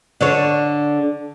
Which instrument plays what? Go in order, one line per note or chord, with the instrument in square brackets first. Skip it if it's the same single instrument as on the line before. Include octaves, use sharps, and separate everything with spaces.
[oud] D3 D4 C#5